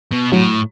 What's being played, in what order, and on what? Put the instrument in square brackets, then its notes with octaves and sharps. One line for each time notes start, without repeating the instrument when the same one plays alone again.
[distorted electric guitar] B2
[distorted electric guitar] A2 [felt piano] F#3